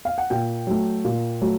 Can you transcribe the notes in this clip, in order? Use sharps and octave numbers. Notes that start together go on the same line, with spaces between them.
F5
F#5
A#2 G5
F#3 A3
A#2
F#3 A3